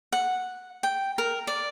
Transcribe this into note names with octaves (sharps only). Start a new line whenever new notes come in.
F#5
G5
A#4
D5